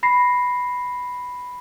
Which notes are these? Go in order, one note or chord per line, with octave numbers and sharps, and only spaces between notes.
B5 A#6 C7